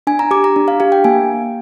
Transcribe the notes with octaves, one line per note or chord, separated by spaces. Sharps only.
D4 G#5
A#5
G4 D6
A#5
D4
F5
G4 F5
G5
A#3 G#5